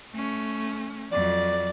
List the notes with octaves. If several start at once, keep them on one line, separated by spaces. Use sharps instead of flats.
A3 C#4
F2 F#3 D5